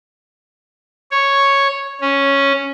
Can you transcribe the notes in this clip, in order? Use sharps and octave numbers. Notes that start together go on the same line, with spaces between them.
C#5
C#4